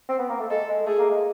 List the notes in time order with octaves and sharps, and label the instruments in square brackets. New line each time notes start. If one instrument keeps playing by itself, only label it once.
[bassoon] C4
B3
A#3
A3
[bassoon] G#3 [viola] A4
[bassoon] G#3
[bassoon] A3 [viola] G#4
[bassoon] A#3
G#3